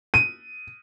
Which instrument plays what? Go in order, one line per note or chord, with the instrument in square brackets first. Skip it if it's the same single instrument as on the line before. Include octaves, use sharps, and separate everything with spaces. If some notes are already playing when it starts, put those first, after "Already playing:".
[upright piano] D#7